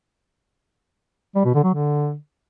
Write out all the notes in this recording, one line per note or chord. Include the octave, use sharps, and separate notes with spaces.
G3
B2
D3
F#3
D3